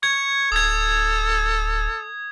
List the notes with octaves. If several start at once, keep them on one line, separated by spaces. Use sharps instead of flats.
C#6 G#6
D1 A4 D#6 G#6